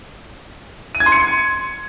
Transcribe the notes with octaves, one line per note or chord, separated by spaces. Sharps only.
D#7
G#6
C6
C#7